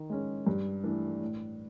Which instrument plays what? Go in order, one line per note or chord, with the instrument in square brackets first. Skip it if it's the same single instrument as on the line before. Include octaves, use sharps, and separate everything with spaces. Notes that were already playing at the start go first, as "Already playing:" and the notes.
Already playing: [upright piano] D#3
G#3 C#4
G2
E3 A3 D4
A2